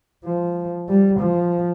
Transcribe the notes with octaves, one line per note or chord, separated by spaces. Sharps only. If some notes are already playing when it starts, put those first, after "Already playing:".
F3
G3
F3